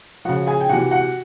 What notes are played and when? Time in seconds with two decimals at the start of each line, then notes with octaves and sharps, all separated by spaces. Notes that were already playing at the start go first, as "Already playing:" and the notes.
0.25 C#3 F3 F#4 F#5
0.47 G#4 G#5
0.61 G5
0.69 C3 E3 F#4 F#5
0.91 F#4 F#5